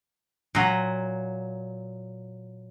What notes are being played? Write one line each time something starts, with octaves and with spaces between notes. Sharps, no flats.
A#2 F#3